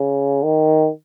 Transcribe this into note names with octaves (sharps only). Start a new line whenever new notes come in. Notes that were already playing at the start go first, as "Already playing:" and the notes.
Already playing: C#3
D#3